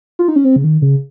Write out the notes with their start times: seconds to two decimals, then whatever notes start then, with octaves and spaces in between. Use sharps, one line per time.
0.19 F4
0.28 D#4
0.36 C#4
0.44 C4
0.56 C#3
0.64 D#3
0.82 C#3